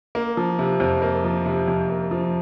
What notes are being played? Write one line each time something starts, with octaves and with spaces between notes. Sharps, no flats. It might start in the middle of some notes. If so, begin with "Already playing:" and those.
A#3
F3
C3
F2
A#3
F3
C3
F2
A#3
F3